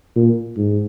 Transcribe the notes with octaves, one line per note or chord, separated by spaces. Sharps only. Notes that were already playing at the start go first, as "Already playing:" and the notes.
A#2
G#2